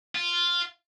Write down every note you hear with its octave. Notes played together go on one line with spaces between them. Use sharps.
F4